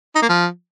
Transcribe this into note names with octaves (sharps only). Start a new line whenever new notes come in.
D#4
A#3
F3